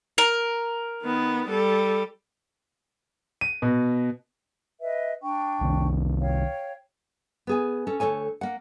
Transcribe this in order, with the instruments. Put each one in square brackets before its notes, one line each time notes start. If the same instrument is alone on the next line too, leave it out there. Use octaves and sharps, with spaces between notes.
[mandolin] A#4
[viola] D#3 B3
G3 A4
[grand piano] D#7
B2
[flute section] B4 D#5 E5
D4 G5 C#6
[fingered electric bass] C2 C3 D#3
[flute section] C#5 F5 G5
[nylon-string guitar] B3 G#4 G#5
C#4 A4
D2 F3 A4 C#5 G#5
A#3 F#5